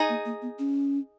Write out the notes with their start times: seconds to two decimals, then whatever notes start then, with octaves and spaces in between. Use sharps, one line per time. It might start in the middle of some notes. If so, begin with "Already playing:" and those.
Already playing: D#4 G#4 D#5
0.09 A#3
0.25 A#3
0.42 B3
0.59 C#4